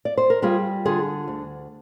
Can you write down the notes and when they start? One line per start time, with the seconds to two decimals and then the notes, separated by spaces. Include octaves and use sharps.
0.05 D5
0.17 C5
0.30 A#4
0.42 G3 F4 G#4
0.85 D3 F4 G#4
1.28 D2